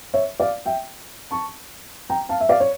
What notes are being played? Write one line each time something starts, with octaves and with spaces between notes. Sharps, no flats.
C#5 E5
D5 F5
E5 G5
A5 C#6
G5 A#5
F5 A5
E5
D5 F5
C#5